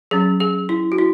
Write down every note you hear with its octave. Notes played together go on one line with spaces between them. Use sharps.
F#3 C#4 G#4
G#4
E4
F#4
E4